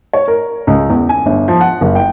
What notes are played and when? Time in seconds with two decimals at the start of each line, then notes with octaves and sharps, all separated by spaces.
0.13 C#5
0.28 A#4
0.67 C#2
0.90 E2
1.09 G#5
1.26 G1
1.48 F3
1.61 F#5
1.81 F#1
1.95 G5